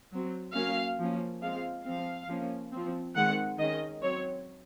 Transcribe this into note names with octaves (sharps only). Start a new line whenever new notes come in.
F#3 C4
F#3 A#3 C#4 F5
F3 A#3 C#4
F3 G#3 C4 F5
F3 C4 F5
F3 A#3 C#4
F3 C4
D#3 G#3 C4 F#5
D#3 G#3 C#4 D#5
F#3 C4 C#5